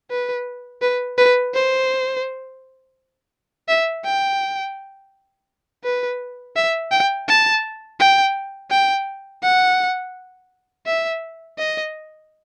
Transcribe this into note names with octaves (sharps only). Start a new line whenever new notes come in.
B4
B4
B4
C5
E5
G5
B4
E5
G5
A5
G5
G5
F#5
E5
D#5